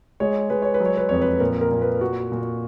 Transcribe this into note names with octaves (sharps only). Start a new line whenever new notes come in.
G#3 C#5
G#3 B4
C#5
B4
F#3
C#5
B4
F2 C#5
B4
A#2 A#4
A#4
A#2
B4
A#2 F#4
A#2